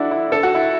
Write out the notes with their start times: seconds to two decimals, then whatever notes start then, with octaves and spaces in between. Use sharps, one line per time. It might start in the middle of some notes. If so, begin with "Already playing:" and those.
Already playing: D4 E4 F#4 A4
0.11 E4
0.32 A4
0.43 F#4
0.55 E4